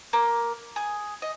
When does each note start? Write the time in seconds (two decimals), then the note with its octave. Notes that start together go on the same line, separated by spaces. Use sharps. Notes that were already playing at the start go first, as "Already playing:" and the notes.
0.13 A#3
0.76 G#4
1.22 D#5